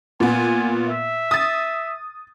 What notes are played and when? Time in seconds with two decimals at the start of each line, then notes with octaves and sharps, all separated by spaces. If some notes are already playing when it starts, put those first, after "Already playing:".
0.20 A#2 B3 G#5
0.87 E5
1.31 D#6 A6